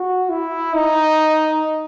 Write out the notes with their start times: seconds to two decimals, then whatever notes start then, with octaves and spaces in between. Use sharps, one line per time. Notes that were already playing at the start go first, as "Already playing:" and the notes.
Already playing: F#4
0.29 E4
0.74 D#4